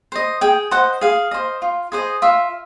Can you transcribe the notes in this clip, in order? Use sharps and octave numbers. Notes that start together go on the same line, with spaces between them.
C5 D#5
G#4 G5
C5 D#5 F#5
G#4 F5
C5 D#5
F4
G#4 C5 D#5
F4 E5